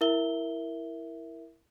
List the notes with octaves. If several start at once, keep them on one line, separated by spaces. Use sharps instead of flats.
E4 A#4 E5 G7